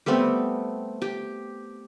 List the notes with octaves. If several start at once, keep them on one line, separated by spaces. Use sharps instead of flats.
G3 A3 B3 C4
G4